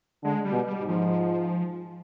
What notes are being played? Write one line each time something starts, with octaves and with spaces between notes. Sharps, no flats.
D3 G#3
G3
B2
G3
G#2
F3